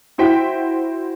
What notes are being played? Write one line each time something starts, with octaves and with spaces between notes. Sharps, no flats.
E4 F#4 C5 G5 B6